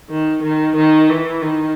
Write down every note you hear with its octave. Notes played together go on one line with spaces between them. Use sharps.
D#3
D#3
D#3
E3
D#3